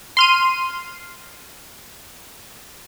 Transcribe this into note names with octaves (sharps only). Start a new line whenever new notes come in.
C6 F6 D#7